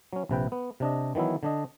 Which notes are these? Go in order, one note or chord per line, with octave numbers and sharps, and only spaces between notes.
F#3 C#4
A#1 C3 B4 G5
B3
C3 D4 D#5
D#3 E3 F#3 B3 E4
D3 D4 D#5